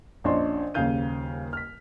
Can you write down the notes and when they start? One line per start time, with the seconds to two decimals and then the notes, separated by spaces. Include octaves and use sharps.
0.24 A#1 C#4 D4 D#5 C6 C#6
0.74 D#1 D#2 C#3 F5 G6 D#7
1.53 F6 B6